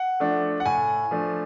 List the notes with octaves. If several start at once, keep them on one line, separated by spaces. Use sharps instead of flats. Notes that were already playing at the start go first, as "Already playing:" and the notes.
Already playing: F#5
F3 A3 D4
F#5
A2 G#5
F3 A3 D4